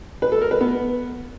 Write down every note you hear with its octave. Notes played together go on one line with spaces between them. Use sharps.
B4
A4
A#4
B4
B3